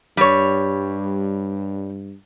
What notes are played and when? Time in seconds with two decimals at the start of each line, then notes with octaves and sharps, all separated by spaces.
0.17 G2 G3 C#5